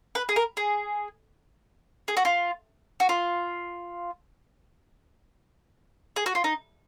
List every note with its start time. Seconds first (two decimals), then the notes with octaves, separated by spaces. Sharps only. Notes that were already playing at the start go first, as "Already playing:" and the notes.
0.15 B4
0.29 G#4
0.36 A#4
0.57 G#4
2.08 G#4
2.17 F#4
2.25 F4
3.00 F#4
3.09 F4
6.16 G#4
6.26 F#4
6.35 F4
6.44 D#4